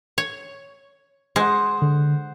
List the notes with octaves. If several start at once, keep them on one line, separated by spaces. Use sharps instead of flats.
C#5
G#3 C5 F#5 C6 D#6
D3